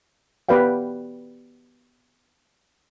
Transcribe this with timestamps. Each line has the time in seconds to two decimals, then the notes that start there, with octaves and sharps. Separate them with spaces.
0.49 B3 G4 B4 D5 F5 G5